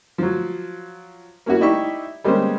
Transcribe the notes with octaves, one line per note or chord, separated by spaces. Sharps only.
F3 F#3
A#3 C#4 E4 F#4
D#4 E4 G4 D5 E5 C#6
G3 G#3 A#3 B3 C#4 C5